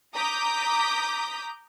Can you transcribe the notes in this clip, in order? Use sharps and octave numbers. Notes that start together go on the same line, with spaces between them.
A#5 D6 D#6 G6 B6